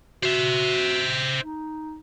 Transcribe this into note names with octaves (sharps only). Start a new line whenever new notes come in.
F#4 C5 E5
D#4